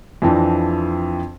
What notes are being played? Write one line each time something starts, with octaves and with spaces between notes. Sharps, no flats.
F2 E3 F3 C4 D4